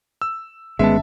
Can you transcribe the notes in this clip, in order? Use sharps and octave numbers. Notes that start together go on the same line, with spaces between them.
E6
G1 D#3 G#3 B3 C#4 E5 A5